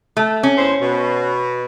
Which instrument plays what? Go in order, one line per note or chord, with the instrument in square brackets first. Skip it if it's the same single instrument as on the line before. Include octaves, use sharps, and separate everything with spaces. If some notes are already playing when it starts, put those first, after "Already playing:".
[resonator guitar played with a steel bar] A3
C#4
[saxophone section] E2 C5
B2